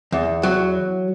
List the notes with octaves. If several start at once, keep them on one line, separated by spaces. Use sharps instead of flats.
E2
F#3